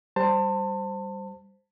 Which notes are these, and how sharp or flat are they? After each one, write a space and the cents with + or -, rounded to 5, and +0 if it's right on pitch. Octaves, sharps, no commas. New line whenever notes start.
G3 +0 C5 +0 A5 +30